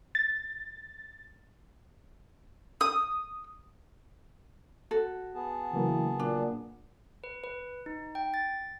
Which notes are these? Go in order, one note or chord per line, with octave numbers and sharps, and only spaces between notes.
A6
D#6
F#4 A4
B3 G#4 A5
C#3 E3 F#3 A#3
A#2 D4
B4
B4
D#4
G5
A6